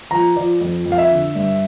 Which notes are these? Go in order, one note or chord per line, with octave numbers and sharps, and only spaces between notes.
F3 A#5
F3 D5
F2
F2
F5
E5
D3
G2